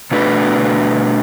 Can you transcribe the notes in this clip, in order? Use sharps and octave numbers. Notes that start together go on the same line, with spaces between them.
B2 A3 D4 F#4 B4